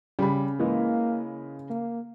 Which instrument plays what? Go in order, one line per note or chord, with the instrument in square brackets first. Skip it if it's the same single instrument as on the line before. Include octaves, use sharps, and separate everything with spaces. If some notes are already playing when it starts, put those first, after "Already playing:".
[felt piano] C#3 B5 [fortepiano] G3
[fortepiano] E3 G#3 [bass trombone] A#3
[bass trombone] A#3